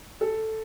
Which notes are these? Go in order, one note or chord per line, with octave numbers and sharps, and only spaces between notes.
A4